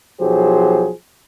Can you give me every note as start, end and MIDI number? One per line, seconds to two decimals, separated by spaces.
0.21 0.93 35
0.21 0.93 53
0.21 0.93 54
0.21 0.93 67
0.21 0.93 68
0.21 0.93 72